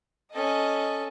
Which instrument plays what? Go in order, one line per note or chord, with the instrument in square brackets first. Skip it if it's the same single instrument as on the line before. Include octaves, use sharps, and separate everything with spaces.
[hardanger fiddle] C#4 A4 [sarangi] D#5